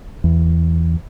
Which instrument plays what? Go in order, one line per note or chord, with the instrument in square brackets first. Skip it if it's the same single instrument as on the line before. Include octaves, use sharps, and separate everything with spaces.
[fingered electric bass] E2